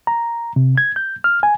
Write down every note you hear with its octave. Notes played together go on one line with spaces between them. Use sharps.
A#5
C3
G#6
G6
F6
G#5